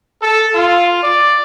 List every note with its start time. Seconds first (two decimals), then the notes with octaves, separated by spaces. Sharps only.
0.21 A4
0.55 F4
1.03 D5